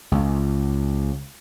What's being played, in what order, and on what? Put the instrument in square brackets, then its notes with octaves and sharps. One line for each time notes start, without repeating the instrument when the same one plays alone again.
[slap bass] C#2